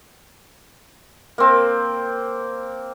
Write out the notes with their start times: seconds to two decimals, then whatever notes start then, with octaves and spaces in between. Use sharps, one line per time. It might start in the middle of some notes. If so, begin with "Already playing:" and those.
1.38 A#3 C4